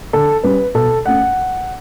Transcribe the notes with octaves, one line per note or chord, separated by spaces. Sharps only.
D3 A4
G3 C#4 B4
B2 A4
A3 C#4 F#5